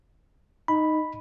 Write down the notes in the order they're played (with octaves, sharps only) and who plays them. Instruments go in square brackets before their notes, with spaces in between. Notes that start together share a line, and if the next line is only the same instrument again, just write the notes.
[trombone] D#4 [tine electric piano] B5